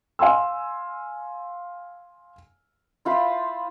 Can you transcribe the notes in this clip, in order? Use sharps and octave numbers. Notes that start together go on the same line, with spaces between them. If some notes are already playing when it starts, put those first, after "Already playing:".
F5 G#5 C6 E6
E4 F4 C5 B5